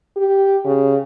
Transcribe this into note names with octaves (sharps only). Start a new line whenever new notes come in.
G4
C#3